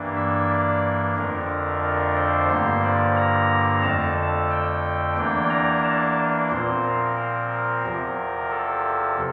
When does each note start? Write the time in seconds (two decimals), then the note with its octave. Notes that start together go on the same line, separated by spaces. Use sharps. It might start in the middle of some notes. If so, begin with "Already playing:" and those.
Already playing: G2 E3 A#3 D4
0.16 E5
0.50 D5
1.16 F2 D3 F3 A3 D4 A#4
1.83 A#4
2.16 C5
2.49 G2 D3 F3 A#3 C5
2.83 D5
3.17 A#5
3.83 F2 D3 A3 A5
4.17 A5
4.51 G5
5.16 E2 E3 A#3 D4 G5
5.50 A#5
5.84 A5
6.50 A#2 F3 C4 C5
6.84 A#4
7.17 A#4
7.83 E2 C3 F3
8.51 A4